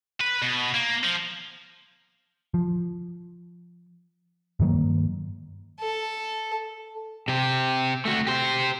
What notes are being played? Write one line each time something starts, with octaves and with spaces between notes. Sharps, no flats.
B4
B2
A#3
F3
F3
G2 D#3 F#3 A#3
A4
C3 G4
A3 F#4
G4 C5